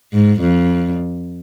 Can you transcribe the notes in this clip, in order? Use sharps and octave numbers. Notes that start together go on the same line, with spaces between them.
G#2
F2